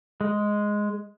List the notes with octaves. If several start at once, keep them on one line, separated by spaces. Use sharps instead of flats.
G#3